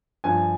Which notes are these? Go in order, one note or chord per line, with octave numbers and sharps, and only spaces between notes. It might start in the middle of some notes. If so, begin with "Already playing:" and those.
G2 F3 G#5